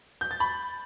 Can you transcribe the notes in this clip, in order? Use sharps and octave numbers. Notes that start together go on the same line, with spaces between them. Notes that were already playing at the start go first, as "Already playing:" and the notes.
G6
A6
B5